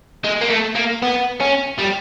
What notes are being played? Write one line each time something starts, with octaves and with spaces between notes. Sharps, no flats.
G#3
A#3
A3
A#3
B3
C#4
G3